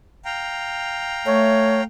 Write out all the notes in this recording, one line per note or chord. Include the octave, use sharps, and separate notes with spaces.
F5 G5 A#5
A3 C#5